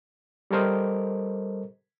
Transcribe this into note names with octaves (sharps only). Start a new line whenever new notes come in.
G3 A4 A#4 C5 D#5